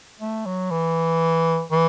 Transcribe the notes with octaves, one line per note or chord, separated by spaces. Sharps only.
A3
F#3
E3
E3